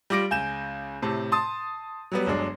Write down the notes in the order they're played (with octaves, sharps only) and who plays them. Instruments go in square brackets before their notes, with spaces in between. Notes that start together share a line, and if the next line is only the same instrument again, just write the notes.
[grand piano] G3 F4 D6 A#6 D7
C#2 G#5 G6 E7
A2 C3 A5
A5 C6 D#6 A6
F#3 G3 B3
G1 F#3 G#3 D4